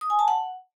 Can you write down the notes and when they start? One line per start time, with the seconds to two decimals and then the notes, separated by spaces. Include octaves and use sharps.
0.01 D#6
0.10 G#5
0.19 A5
0.28 F#5